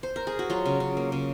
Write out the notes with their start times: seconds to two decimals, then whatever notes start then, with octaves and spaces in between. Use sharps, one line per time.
0.03 C5
0.16 A#4
0.27 G#4
0.39 F#4
0.50 F#3 F4
0.66 C#3
0.80 C#3
0.97 A#3
1.12 C#3